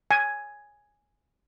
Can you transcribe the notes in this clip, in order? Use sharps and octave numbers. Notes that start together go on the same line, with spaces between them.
G#5